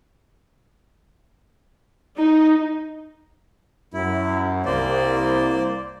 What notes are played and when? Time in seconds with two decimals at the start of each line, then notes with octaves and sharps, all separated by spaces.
2.16 D#4
3.94 F#2 E4
4.65 C2 A#3 C5 D5